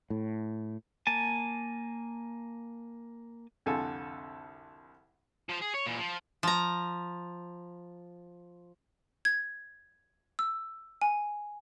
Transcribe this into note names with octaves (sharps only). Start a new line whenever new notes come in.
A2
A#3 G#5 A5
C2 F2 D3 A4 G#5
F3 C5
G#4
C#5
A#2 E3
F3
F3 A#5
G#6
E6
G#5